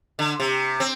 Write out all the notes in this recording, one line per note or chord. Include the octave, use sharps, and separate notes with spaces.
D3
C3
C4